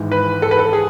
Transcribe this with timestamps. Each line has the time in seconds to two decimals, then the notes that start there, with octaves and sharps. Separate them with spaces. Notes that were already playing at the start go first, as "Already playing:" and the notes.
Already playing: G#1 G#2 E3
0.12 B4
0.42 A4
0.51 B4
0.59 A4
0.73 G#4